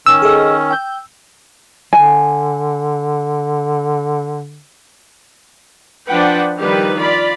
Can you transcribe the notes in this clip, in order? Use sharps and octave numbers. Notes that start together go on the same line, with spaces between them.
D#3 C#4 E6
G#4 A4 D#5
G5 G6
D3 G#5
F3 D4 B4 F#5 G5
D#3 F3 G3 G4 B4
F4 D5 B5